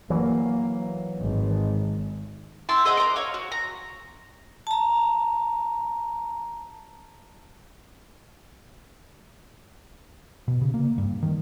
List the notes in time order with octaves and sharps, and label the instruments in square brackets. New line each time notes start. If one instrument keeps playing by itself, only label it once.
[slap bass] E3 F#3 [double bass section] A#3
[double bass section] G#1
[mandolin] E4 A5 C6 E6
G#4 C5 D#5 F#5
C5 A#5 D6
C#5 F5
F#4
A#5
[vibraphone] A5 A#5
[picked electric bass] B2
C#3
A#3
G2
D#3